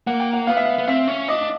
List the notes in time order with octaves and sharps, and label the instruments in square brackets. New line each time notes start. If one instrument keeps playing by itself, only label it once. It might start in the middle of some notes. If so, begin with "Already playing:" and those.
[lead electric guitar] A#3 [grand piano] F#5
[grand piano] G5
F#5
[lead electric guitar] B3 [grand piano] F5
[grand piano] E5
F5
[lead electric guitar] B3
[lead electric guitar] C4 [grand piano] E5
[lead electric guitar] C#4
[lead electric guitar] D4 [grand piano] D#5